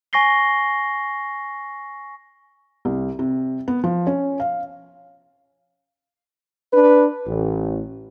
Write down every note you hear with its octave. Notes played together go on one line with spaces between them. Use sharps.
G#5 C#6 A#6 C7 G7
C2
C3
B3
F3
C#4
F5
D4 B4
A1